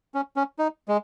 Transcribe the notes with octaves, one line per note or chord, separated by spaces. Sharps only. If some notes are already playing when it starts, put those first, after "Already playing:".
C#4
C#4
D#4
G#3